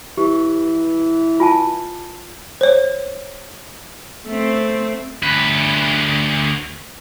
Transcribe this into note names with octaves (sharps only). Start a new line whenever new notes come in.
E3 G4
F4 G#5 A5
C5 C#5
A3 C4
D2 B4